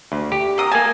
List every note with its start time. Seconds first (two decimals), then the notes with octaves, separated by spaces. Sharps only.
0.12 D2
0.32 G4
0.58 A#3 D#6
0.72 A#3 G#5 A5